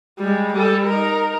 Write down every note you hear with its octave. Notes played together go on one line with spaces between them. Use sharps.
G3 G#3
G3 A4
D#4 A#4